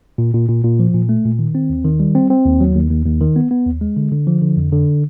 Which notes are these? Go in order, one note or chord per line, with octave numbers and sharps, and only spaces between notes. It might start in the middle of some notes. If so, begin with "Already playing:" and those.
A#2
A#2
A#2
A#2
F3
A#2
A3
A#2
D#3
C4
D#2
D#3
G3
C4
C4
D#2
F#3
D#2
D#2
D#2
D#3
B3
B3
D#2
G#3
D3
D3
F3
D3
F2
D3